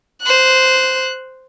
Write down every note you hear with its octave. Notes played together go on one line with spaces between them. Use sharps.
C5 F#6